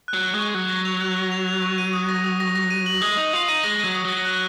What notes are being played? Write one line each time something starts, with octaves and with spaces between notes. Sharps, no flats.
F#6
F#3
F#6
G#3 C#6
F#3 F#6
A#6
F7
F#6
A#6
F7
F7
C#6
D#7
D#6
A#6
D#6
A#6
A#6
D#7
F#7
G#3 D#6
D#4 D#6
F4 D#6
D#4 D#7
G#3 A#6
F#3 D#7
D#6
F#3
A#6
F#6